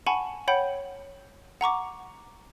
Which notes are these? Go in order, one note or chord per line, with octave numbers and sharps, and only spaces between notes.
F#5 G#5 A5 B5 C#6
C#5 F#5 G5 B5 G6
F#5 A#5 C#6 D6